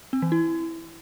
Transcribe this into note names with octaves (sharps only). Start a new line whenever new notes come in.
C4
E3
E4